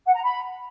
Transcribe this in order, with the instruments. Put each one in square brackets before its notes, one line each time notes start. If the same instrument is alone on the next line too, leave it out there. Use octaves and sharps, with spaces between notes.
[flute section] F#5
A#5
B5